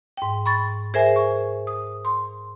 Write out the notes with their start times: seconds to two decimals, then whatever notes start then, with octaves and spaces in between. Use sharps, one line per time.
0.17 G#2 G5
0.46 B5 C#6 A6
0.94 G#4 A#4 C5 E5 G#5
1.16 C#6
1.67 D#6
2.05 C6